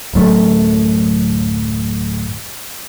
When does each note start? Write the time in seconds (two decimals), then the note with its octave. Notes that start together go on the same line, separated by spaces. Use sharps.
0.14 D1 F#2 A3